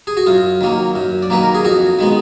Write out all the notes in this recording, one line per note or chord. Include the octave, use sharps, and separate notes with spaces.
G#4
F#4
F#2 F4
D#3 F#3 A#3
F#2
D5
D#3 F#3 A#3 B4
A#4
G#4
F2 F#4
D#3 G#3 B3